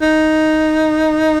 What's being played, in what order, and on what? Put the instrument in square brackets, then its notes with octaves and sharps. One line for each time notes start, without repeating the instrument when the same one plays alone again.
[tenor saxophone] D#4